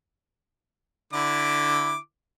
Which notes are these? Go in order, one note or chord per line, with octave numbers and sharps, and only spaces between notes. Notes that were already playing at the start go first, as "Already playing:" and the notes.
D3 E4 D6